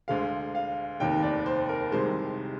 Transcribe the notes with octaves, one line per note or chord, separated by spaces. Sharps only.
D2 D3 G#3 F5
F5
F1 D#2 D#3 G5
D5
C5
A#4
C2 C3 D#3 G#3 C5